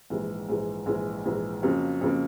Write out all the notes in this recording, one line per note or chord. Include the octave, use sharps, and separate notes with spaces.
A#1 G#2 E3 G#3
A#1 G#2 E3 G#3
A#1 G#2 E3 G#3
A#1 G#2 E3 G#3
F2 C#3 F#3 A#3
F2 C#3 F#3 A#3